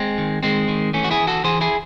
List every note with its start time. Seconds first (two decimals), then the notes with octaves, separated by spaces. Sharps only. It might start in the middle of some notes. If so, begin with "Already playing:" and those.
Already playing: G#3 C4
0.18 D#3
0.43 D#3 G#3 C4
0.68 D#3
0.93 E3 A3 C#4
1.04 F#4
1.11 E4 G#4
1.20 E3
1.27 F#4 A4
1.44 E3 G#4 C5
1.61 E4 G#4